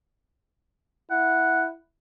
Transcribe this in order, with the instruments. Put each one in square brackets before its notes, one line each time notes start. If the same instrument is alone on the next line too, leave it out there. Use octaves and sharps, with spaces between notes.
[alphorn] E4 [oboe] F#5